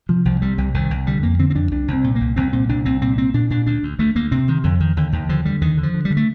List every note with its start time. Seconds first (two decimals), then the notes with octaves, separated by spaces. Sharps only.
0.09 C3 F3
0.25 C2 F3
0.42 C3 G3
0.58 C2 G3
0.74 C2 D#3
0.91 C2
1.06 D3 G3
1.23 F2 A#3
1.39 D3 C4
1.50 C4
1.55 F2 D4
1.71 C2 D4
1.88 C2
1.93 C4
2.04 A#2
2.15 A#3
2.20 C2
2.36 C2 C4
2.53 A#2 C4
2.69 C2 D4
2.85 C2 C4
3.02 A#2 C4
3.18 A#2 C4
3.34 A#2 D4
3.50 A#2 D4
3.66 D2 D4
3.83 D2
3.99 D2 A3
4.15 D2 A#3
4.32 C3 C4
4.48 C3 D#3
4.64 F2 D3
4.80 F2 D#3
4.97 D#2 D3
5.12 D#2 D#3
5.29 D3 F3
5.45 D3 G3
5.61 D#2 D#3
5.78 D3
5.83 F3
5.94 D3
6.05 G3
6.11 D3
6.17 A3